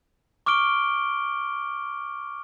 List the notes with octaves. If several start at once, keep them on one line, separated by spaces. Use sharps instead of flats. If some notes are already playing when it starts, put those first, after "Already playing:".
C#6 D6 F6 D7 G7